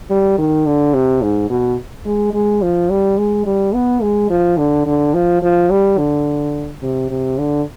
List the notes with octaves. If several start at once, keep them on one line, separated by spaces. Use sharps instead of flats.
G3
D#3
D3
C3
G#2
B2
G#3
G#3
F3
G3
G#3
G3
B3
G#3
F3
D3
D3
F3
F3
G3
D3
C3
C3
D3